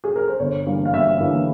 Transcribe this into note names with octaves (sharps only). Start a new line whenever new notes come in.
G#4
A#4
C5
G1 C#5
G2 E3 G3 A#3
F5
G1 E5
G2 E3 G3 A#3